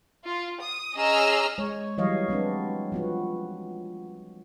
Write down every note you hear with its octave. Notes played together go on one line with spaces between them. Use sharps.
F4
D#6
C#4 G#4 D#5 A#5 E6 F6
G#3 C#5
E3 F#3 G3 C#5 D#5 F5
G#3 B3 C4 D4
F3 B3 F#4